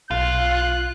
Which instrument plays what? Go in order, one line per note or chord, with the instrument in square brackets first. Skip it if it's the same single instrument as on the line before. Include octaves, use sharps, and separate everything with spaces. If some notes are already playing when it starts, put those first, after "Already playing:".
[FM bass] B1 [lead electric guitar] F4 [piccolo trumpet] F#6